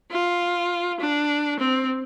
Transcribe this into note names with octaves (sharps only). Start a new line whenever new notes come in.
F4
D4
C4